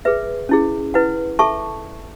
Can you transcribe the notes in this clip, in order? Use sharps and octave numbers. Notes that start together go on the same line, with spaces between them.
G#4 B4 E5
C#4 E4 G#4
E4 B4 F#5
A4 E5 A5 C#6